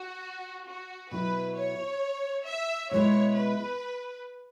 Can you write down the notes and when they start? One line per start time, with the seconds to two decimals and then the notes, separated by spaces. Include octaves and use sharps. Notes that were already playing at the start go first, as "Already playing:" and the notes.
Already playing: F#4
0.67 F#4
1.11 B2 F#3 E4 B4
1.57 C#5
2.47 E5
2.91 B2 G#3 E4 C#5
3.36 B4